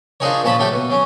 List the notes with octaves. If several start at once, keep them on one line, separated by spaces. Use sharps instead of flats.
F3 D4 D#4 G#4 A#4 C#5
A#2 F3 C#4 A5 B5
F#3 A3 G4 A4
B2
F#3 C#4